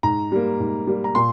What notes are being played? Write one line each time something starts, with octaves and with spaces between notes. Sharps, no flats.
G#2 A#5
G3 A#3
G#2
G3 A#3
A#5
A#2 C6